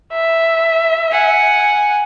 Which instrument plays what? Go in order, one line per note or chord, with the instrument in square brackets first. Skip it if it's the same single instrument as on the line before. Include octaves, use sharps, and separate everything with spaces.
[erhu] E5
[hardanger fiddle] F#5 G#5